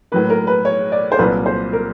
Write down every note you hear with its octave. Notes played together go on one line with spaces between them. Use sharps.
A2 F#3 A#3 B4
A#4
B4
C#5
D5
C5
C2 A#2 F#3 A#3 B4
C5
A#4